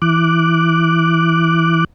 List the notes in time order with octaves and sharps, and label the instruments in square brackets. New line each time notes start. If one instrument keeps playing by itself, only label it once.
[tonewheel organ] E3 D6 F#6